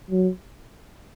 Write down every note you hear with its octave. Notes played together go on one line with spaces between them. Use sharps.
F#3